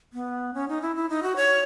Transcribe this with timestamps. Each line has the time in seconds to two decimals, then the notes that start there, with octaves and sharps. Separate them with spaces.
0.13 B3
0.54 C#4
0.68 D#4
0.82 E4
0.96 E4
1.09 D#4
1.23 F#4
1.36 C#5